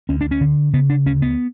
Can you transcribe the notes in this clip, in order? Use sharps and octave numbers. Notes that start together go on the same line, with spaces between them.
D2 C#4
D4
C#4
D3
C#3 B3
D4
D2 C#4
B3